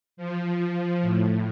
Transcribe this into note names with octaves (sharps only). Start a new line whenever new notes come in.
F3
A2